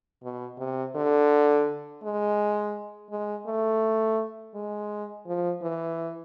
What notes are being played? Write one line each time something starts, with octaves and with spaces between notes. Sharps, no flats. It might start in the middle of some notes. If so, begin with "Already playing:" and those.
B2
C3
D3
G#3
G#3
A3
G#3
F3
E3